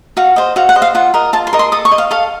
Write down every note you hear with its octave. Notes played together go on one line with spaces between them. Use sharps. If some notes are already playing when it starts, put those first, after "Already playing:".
F#4 F5
C5 D#5
F#4 F5
F#5
C5 D#5
F5
F4 F#5
A#4 D#5
F4 A5
C6
A#4 D#5
C6
A4 D#6
C#6
D#5
F5
A4 F5